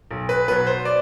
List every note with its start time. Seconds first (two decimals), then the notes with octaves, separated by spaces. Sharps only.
0.11 B1
0.29 B4
0.48 B2 F#3 B4
0.67 C5
0.85 D5